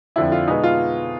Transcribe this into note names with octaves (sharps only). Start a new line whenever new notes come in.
F2 D3 F3 E4
F4
B2 G#3 B3 D#4
F4